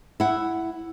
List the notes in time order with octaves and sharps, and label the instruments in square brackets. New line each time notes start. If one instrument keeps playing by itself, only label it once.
[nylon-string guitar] E4 F#5